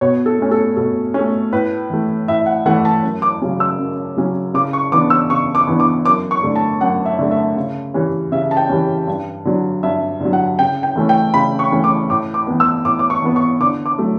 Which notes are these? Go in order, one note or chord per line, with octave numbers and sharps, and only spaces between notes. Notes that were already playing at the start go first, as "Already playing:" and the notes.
B2 C#5
A4
A3 C#4
A4
B2 A4
A3 C#4
A2 B4
E3 A3
A2 E5
F#5
E3 A3 F#5
A5
F#2
D6
C#3 F#3 C#4
E6
F#2
C#3 F#3 C#4
C#3 D6
C#6
E3 B3 D4 D6
E6
C#3 C#6
D6
E3 B3 D4
D6
F#2 D6
C#6
D3 A3
A5
F#2 F#5
E5
D3 A3
E5
C#3
E3 G3 C#4
C#3 E5
A5
G5
E3 G3 C#4
G2
D3 F#3
G2 E5
D3 F#3
F#5
C#3 G5
G5
E3 A3 C#4
G5
C#3 B5
C#6
E3 A3 C#4
D6
A2 D6
D6
E3 B3
E6
A2 D6
D6
C#6
E3 B3
C#6
D3 D6
D6
F#3 A3